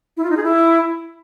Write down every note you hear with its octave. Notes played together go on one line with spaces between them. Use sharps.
E4
F4
D#4
G#4
E4